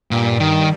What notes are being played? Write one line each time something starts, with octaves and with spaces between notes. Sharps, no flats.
G2 A#2 G3
D#3